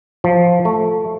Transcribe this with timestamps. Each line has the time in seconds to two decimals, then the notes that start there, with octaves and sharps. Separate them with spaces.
0.24 F3
0.65 A3